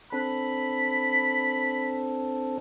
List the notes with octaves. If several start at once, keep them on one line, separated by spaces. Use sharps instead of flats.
C4 D4 A4 B5